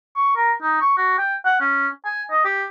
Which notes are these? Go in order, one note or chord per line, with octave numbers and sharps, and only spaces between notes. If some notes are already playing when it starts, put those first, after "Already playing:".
C#6
A#4
D#4
C#6
F#4
G5
F#5
C#4
G#5
D#5
G4